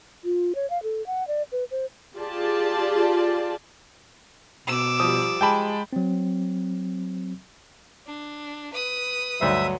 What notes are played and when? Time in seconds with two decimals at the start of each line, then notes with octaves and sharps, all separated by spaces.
0.25 F4
0.55 C#5
0.70 F5
0.83 A4
1.07 F#5
1.28 D5
1.52 B4
1.71 C5
2.15 F4 G4 G#4 D5 A5
4.68 B2 D6 E6
5.00 F3 G3 D#6
5.41 G#3 G5 A5 B5
5.93 F#3 C4
8.07 D4
8.74 B4 D#6
9.41 D2 G2 F#3 C5 E5